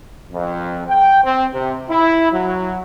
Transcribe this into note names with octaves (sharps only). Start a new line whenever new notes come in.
F2
G5
C4
C3
E4
F#3